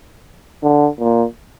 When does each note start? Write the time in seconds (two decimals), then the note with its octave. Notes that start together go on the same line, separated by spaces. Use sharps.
0.63 D3
0.99 A#2